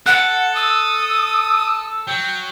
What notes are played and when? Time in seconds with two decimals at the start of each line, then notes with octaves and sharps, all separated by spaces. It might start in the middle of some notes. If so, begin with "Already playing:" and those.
0.06 A4 F#5 F#6
0.55 D#6 E6
2.08 F#3 G5